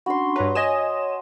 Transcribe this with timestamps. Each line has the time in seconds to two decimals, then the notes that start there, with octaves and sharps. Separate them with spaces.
0.06 C#4 D4 F#4 B5 C6
0.36 G2 B4 C#5 A#5
0.55 D#5 G#5 D#6 E7